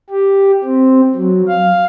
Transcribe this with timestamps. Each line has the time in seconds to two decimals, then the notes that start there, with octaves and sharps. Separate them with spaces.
0.10 G4
0.64 C4
1.15 F#3
1.48 F5